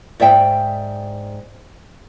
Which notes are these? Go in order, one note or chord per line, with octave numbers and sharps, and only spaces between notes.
G#2 D5 E5 G5